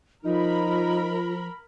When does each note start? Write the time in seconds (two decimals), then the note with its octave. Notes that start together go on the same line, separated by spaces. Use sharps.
0.24 F3 D#4 F4 A#4 B5